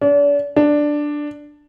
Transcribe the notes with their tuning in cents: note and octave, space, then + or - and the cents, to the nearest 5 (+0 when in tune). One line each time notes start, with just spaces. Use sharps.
D4 -40
D4 +5